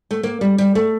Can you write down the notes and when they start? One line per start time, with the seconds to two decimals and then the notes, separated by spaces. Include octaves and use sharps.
0.11 A3
0.23 A#3
0.41 G3
0.58 G3
0.75 A3